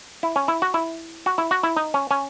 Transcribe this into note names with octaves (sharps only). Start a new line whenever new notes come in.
E4
C#4
E4
F#4
E4
F#4
E4
F#4
E4
D#4
C#4
C#4